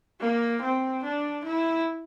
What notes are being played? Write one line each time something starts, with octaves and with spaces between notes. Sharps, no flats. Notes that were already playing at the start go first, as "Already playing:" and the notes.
A#3
C4
D4
E4